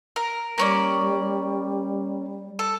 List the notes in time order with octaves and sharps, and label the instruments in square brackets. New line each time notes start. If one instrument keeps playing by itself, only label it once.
[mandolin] A#4
[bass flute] G3 [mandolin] A#3 C#4 D5
[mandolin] A4